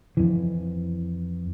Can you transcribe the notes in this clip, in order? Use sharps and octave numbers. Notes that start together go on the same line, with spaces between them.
F2 E3